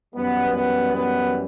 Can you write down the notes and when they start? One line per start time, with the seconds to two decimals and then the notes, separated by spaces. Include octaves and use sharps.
0.14 F#2 E3 G3 B3
0.53 B3
0.92 B3